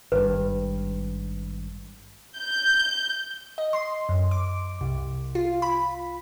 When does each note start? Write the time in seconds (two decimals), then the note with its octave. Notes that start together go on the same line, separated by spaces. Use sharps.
0.12 G#1 G2 B4
2.37 G6
3.58 D#5
3.73 C6
4.09 F#2
4.31 D6
4.81 C2
5.35 F4
5.62 B5